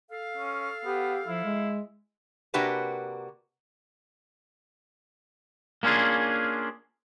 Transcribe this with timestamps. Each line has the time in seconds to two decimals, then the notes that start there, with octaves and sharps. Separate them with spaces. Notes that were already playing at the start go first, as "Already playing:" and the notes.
0.10 A4 F5
0.37 C#4
0.85 B3 G4
1.27 F3 E4
1.44 G#3
2.54 C3 A#3 D4 F#4 G4 B4
5.83 A#3 C#4 D4 F4 G#4